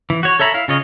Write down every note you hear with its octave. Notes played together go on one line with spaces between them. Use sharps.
E3
F#4 C#5
A4 C#5 E5 A#5 B5
E4 F5
C#3 F4 C#5 D#5